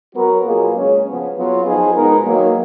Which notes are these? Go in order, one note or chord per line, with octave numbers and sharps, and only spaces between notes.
F#3 B3 F#4 A#4
B2 F#3 A#3 F4 G#4
C#3 G#3 C#4 G#4
C#3 F3 B3
F#3 B3 F4
F3 B3 D#4 G#4
B2 G#3 B3 D#4 A#4
D#3 F#3 A#3